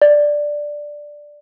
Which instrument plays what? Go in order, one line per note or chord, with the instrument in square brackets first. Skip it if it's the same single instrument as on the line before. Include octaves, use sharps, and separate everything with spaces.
[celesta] D5